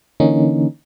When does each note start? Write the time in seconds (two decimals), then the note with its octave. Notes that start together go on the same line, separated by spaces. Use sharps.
0.20 D3 E3 A#3 C#4 D#4